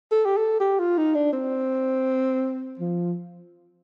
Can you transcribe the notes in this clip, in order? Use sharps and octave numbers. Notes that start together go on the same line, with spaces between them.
A4
G4
A4
G4
F4
D#4
D4
C4
F3